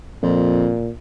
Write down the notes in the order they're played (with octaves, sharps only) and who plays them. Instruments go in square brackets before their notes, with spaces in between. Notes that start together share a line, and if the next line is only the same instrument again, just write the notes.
[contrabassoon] F2 [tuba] A#2